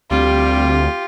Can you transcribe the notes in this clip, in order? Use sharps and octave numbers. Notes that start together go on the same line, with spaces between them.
D2 G3 C4 F4 G4